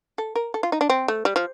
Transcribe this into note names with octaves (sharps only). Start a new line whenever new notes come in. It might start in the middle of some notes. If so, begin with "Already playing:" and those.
A4
A#4
A4
F4
D#4
D4
C4
A3
G3
F3